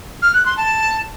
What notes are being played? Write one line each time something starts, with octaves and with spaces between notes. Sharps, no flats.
F6
F#6
C6
A5